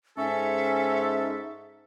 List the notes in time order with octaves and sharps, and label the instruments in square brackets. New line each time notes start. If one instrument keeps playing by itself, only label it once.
[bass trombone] G#2 [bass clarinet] C#4 [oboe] A4 [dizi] E5